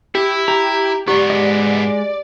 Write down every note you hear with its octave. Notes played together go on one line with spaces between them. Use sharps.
E4 G4
G4 A#5
G#2 B3 G4 D5
G#3 D#5